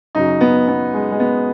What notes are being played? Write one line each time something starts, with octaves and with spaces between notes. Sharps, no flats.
F#2 C#3 F#3 D#4
B3
B3
G#3
G#3
B3